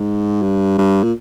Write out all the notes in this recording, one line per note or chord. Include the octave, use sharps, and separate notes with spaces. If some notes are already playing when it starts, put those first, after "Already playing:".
Already playing: G#2
G2
G2
A#2